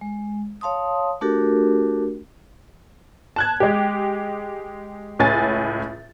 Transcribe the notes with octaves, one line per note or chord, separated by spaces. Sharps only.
G#3
C#5 F5 A5 C6 D#6
A3 D4 F#4 G4 A4 A#4
A5 F#6 G#6
G#3 G4
C#2 A2 C#4 G#5 A6